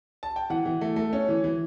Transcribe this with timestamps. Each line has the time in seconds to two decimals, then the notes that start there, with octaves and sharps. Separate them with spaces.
0.23 A5
0.36 G5
0.50 E3 F#5
0.66 E3
0.81 A3
0.96 A3
1.13 C#4
1.29 E3
1.44 E3